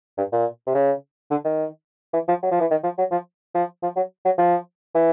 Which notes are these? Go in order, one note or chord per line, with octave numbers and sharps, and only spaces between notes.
G2
A#2
C3
C#3
D3
D#3
E3
F3
F#3
F3
E3
D#3
F3
F#3
F3
F3
F3
F#3
F#3
F3
E3